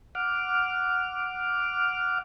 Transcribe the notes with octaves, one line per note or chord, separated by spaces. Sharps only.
F#5 D6 F6